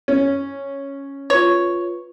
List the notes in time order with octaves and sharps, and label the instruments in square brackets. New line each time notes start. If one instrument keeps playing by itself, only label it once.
[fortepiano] C#4
[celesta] F4 B4 [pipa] C#5